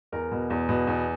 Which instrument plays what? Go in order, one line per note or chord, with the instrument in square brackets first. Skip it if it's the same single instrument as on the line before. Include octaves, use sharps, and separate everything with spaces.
[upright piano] E2 A#4
B2
E2
B2
E2